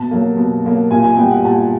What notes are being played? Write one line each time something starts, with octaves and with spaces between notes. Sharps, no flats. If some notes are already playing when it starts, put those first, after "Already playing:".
Already playing: B2 A5
F#3 A#3
B2
F#3 A#3
A#2 G#5
G#5
G3 B3 G5
F#5
A#2 A5